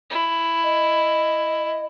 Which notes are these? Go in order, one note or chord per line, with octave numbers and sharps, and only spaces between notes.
E4
D#5